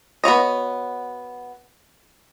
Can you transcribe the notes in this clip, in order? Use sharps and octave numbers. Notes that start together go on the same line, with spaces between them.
B3 F#4 C#5 D#5